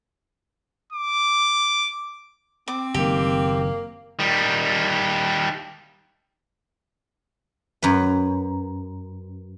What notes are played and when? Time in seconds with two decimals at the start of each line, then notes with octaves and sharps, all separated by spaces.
0.92 D6
2.68 C4 D6
2.94 F#1 D#3 A#3 G4
4.19 D#3 G3
7.82 F#2 B4